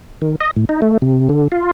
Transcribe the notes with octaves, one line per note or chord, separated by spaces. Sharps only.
D#3
D#5
A2
D#4
A3
C3
D3
F4